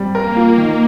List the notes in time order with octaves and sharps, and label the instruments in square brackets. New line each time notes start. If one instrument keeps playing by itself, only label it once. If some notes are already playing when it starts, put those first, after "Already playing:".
Already playing: [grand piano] G3 C4
[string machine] A#3 [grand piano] A#4
[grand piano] F4
D#3